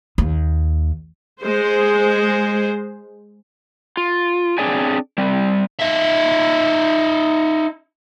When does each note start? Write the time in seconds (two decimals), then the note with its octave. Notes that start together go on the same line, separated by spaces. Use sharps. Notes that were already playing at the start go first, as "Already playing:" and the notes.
0.18 D#2
1.39 G#3 C5
3.97 F4
4.58 C4 D4 G#4 C#5 D5 G#5
5.18 G3 C4
5.79 D#4 E5